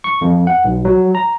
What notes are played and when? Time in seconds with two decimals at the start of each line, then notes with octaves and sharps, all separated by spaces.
0.04 C#6
0.21 F2
0.47 F#5
0.65 B1
0.85 F#3
1.15 A#5